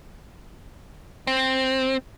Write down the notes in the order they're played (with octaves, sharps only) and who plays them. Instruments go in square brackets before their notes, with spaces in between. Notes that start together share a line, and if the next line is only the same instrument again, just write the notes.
[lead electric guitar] C4